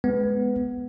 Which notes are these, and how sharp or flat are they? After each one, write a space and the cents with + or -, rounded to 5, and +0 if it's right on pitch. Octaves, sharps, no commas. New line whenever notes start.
G#3 +20 B3 +5